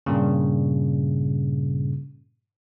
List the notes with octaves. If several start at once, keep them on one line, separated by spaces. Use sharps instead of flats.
G2 A#2 C#3